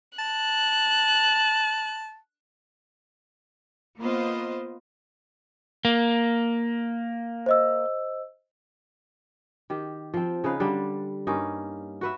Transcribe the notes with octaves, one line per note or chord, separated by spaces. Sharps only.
A5 F#6
A#3 B3 F4 C5 D#5
A#3
C5 D#5 E6
D#3 G4
F3 C4
C#3 D#4 B4 F5
D3 G3 D4
G2 A#3 C#4 D#4
F#4 B4 E5